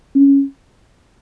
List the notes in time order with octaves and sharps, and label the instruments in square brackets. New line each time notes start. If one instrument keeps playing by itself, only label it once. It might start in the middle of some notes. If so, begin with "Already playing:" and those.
[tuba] C#4